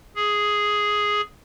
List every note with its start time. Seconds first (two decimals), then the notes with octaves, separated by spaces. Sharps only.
0.16 G#4